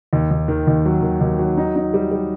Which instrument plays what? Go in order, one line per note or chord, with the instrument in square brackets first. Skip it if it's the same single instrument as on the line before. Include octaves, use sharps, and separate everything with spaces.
[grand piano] D#2
D#2
D#3
D#2
F#3
D#3
D#2
F#3
D#4
D#4
G3
G3